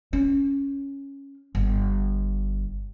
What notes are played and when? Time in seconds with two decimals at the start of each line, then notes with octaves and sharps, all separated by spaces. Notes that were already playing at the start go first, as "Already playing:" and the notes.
0.13 C#4
1.55 G1